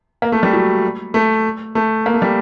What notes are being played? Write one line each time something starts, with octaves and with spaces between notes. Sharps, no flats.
A#3
A3
G3
F#3
A3
A3
A#3
A3
G3